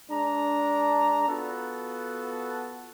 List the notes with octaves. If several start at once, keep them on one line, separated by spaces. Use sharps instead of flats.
G#3 D4 A#5
B3 F4 F#4 A4